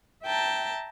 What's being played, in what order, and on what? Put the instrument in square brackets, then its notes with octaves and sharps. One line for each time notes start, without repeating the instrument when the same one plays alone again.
[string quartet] E5 G5 A5 A#5